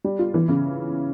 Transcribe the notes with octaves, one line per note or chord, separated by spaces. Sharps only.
G3
F4
E3
C#3